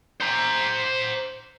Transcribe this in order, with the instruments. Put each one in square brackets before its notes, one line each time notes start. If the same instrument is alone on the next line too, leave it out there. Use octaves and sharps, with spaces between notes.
[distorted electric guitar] C5 A#5